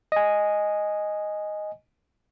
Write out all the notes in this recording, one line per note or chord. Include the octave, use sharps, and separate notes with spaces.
D#5 G#5